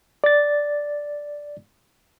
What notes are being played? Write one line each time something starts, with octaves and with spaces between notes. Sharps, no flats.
D5 A6